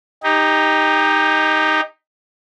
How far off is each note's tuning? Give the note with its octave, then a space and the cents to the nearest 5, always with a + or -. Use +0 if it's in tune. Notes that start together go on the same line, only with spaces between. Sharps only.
D#4 +0 G4 +25